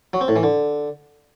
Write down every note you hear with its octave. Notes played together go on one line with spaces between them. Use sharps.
F#3
C4
A2
E3
D3